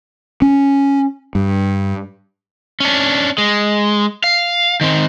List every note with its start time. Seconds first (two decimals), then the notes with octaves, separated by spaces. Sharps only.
0.42 C#4
1.35 G2
2.80 C#4 D4
3.38 G#3
4.24 F5
4.81 D#3 C4